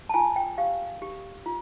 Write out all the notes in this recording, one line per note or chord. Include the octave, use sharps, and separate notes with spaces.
A5
F4 G#5
G5
G4 F5
G4
F4